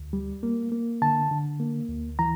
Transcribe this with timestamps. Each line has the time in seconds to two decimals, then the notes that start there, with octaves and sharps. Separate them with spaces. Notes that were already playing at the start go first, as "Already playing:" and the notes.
Already playing: D2
0.13 G3
0.43 A#3
0.72 A#3
1.02 D3 A5
1.31 D3
1.60 A#3
1.89 D2
2.19 E3 A#5